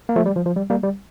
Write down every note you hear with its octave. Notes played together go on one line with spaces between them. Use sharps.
A#3
F3 A3
G3
F3
F3
G3
G3 A#3
G3